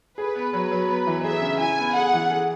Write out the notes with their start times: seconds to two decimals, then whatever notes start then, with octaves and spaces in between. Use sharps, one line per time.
0.18 G#4 B4
0.35 B3
0.53 F#3
0.71 F#3
0.89 B3
1.07 E3
1.24 G#4 E5
1.42 C#3
1.59 E4 G#5
1.78 B3
1.95 G#4 F#5
2.13 E3
2.31 G#4